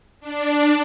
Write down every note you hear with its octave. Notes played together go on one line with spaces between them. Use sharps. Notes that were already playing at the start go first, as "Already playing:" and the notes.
D4